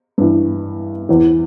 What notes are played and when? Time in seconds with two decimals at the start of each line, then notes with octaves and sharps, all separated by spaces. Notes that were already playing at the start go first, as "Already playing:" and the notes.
0.18 G2 E3
1.09 E2 E3